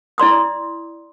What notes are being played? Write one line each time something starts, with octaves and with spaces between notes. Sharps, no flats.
E4 D5 C6 D#6